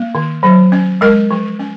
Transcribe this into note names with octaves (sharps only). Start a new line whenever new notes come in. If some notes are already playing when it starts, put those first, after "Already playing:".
Already playing: A#3
D#3
F#3
C#4
G#3 A#4
F3
C#4